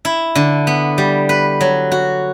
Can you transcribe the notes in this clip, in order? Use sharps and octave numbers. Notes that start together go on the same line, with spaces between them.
E4
D3
B3
G3
B4
F#3
F#4